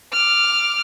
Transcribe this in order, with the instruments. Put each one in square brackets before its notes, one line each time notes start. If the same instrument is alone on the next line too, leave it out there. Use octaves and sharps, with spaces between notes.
[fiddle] D6 F6